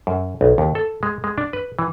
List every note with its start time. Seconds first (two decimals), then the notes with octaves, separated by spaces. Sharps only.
0.07 F#2
0.41 B1
0.58 D#2
0.75 A4
1.03 G#3
1.24 G#3
1.38 D4
1.53 B4
1.79 E3